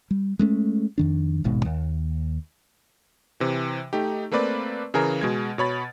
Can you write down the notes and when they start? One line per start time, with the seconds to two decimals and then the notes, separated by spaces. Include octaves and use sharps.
0.11 G3
0.39 G#3 A3 C#4
0.98 F2 D#3 D4
1.44 D#1 G#1 G#2 B2
1.65 D#2
3.40 C3 E3
3.93 A3 D#4 G4
4.31 A3 A#3 C4 B4 D5
4.94 C#3 E3 G#4 A#4
5.21 B2 G#3 G#6
5.58 B2 C#5 B5 A6